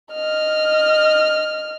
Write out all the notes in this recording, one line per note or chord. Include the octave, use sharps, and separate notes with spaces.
D#5 F6